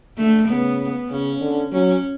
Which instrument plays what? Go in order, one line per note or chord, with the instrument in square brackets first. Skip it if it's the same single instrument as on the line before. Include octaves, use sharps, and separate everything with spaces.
[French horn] D3 [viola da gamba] A3
[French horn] C#3 [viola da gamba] B3
[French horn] C#3 [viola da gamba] C#4
[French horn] D3
[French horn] F#3 [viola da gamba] C#4